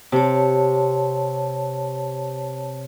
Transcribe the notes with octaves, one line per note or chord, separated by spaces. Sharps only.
C3 C#5 A5